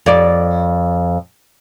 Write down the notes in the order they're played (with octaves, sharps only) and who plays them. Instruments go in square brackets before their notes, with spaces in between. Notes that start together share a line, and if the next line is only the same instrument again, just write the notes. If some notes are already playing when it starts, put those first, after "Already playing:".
[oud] F2 D5